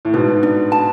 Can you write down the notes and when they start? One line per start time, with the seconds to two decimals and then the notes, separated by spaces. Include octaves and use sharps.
0.05 A2
0.14 G#2 B2 D4
0.43 D4
0.72 A5